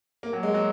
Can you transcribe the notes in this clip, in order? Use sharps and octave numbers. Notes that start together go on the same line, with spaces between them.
A#3
F#3
G#3
F#3